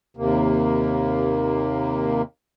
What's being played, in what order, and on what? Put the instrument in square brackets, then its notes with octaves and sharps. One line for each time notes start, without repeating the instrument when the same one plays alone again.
[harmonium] D#2 C3 A#3